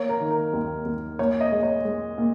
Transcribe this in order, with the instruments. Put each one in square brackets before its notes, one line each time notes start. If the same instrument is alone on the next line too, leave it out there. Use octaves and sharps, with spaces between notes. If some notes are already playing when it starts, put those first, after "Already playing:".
Already playing: [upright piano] A#3 C#5
A#4
D#3
A#4
D#2
D#2
A#2 C#5
D#5
G#3
C#5
G#3
A#2